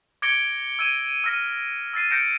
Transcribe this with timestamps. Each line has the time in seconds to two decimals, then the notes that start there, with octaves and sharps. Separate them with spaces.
0.22 D6 G#6 A#6 C#7 D7 G7
0.79 E6 G#6 D#7 E7
1.24 E6 F6 A#6 B6 D#7
1.94 E6 A6 C7 D#7
2.10 G6 A#6 C#7 D7 E7